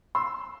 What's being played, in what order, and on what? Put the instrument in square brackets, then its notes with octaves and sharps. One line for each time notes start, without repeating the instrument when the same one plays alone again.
[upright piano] C6 E6